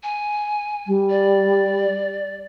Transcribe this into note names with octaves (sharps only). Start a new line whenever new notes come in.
G#5
G3
D5